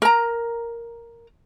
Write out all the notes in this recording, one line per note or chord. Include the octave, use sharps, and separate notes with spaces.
A#4 A#5